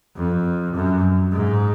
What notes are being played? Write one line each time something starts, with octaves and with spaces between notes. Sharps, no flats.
F2
F#2
G#2